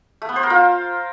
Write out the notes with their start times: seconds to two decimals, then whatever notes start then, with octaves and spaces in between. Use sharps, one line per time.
0.22 A3
0.29 B3
0.36 C5
0.43 A#4
0.50 F4